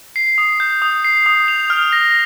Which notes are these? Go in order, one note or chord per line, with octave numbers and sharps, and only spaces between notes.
C7
D#6
G6
D#6
C7
D#6
F7
F6
A#6